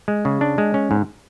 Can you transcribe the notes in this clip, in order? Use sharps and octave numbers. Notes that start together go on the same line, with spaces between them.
G#3
C#3
D4
G#3
C#4
G#2